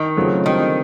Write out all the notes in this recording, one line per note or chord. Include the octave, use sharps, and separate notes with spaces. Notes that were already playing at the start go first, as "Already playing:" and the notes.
Already playing: D#3
C#3 F#3 A3 C4 F4
D3 D#3 G3 C4